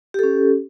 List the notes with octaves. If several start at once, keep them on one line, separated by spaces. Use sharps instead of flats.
C#4 G4 A4